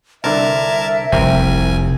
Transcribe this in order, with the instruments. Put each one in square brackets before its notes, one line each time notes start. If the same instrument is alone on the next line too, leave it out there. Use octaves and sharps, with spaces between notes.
[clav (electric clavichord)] C2 D3 [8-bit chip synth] A#4 A5 G#6 [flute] E5
[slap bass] F1 [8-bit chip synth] C2 G#5 [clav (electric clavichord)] C4 A#4